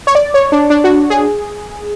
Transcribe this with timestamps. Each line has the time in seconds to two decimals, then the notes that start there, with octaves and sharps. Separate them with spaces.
0.07 C#5
0.15 D5
0.34 C#5
0.52 D4
0.70 D4
0.84 F#4
1.10 G#4